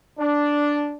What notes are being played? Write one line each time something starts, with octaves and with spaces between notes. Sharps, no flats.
D4